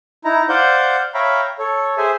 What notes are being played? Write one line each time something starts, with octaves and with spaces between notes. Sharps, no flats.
D#4 E4 A#5
C5 D5 F5 F#5 G6
C#5 E5 F5 G5 A#5 B5
A4 C#5
G#4 C5 E5 G#5